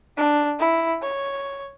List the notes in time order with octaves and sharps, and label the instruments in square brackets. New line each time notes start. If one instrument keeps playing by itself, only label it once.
[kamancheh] D4
E4
C#5